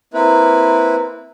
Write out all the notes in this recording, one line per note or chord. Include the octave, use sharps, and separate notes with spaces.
A#3 C4 E4 B4